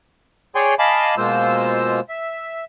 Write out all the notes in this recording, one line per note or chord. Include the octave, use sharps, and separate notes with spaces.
G#4 C#5 D5 G5 G#5 C6
D#5 F5 G#5 A5 B5 D6
B2 G#3 A#3 F4 C5 E6
E5